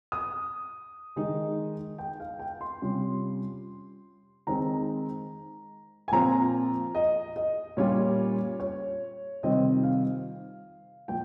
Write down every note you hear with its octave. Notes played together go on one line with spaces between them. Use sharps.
D#6
D#3 G#3 D#4
G5
F5
G5
C6
C3 G3 C#4 F4
D#3 G#3 C4 D#4 A#5
G#5
A#2 F3 C4 F4 A#5
D#5
D#5
A#2 G3 C#4 F4 C#5
C#5
C3 D#3 G3 C4 F4 D#5
F5
A#2 F3 G5